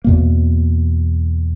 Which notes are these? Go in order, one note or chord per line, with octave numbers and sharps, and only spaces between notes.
E2 B2 A#3